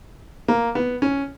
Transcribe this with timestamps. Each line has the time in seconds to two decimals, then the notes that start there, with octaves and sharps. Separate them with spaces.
0.48 A#3
0.75 B3
1.02 C#4